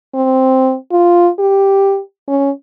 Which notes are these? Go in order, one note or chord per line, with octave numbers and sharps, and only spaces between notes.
C4
F4
G4
C#4